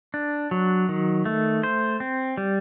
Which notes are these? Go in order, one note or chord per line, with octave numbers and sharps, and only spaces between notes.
D4
F#3
D#3
A3
C5
C4
G3